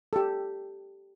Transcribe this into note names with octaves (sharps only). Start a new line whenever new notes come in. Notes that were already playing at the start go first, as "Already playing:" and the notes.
G4 A4